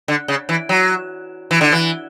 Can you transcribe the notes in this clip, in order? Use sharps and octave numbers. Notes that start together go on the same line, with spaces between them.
D3
C#3
E3
F#3
E3
D3
E3